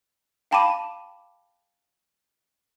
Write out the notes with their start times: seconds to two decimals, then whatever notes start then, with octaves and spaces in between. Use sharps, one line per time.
0.51 F5 G5 A5 B5 D6 D#7